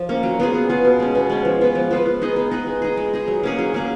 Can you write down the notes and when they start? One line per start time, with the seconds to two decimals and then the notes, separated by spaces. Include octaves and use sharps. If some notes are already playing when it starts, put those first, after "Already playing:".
Already playing: F3
0.09 A#3 C#4
0.23 F#3
0.40 B3 F4 G#4
0.54 F#3
0.69 B3 F4 G#4
0.85 B2
1.00 G#3 C#4
1.15 B2
1.30 G#3 C#4
1.45 F3
1.61 B3 F4 B4
1.75 F3
1.91 B3 F4 B4
2.06 B3
2.22 D#4 G#4 B4
2.36 B3
2.51 D#4 G#4 B4
2.67 G#3
2.82 D#4 G#4
2.97 G#3
3.13 D#4 G#4
3.28 F#3
3.43 A#3 C#4 G#4
3.59 F#3
3.74 A#3 C#4 G#4